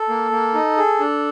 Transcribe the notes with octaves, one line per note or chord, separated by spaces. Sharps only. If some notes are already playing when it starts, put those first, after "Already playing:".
Already playing: A4
A#3
A#3
D#4
G#4
D4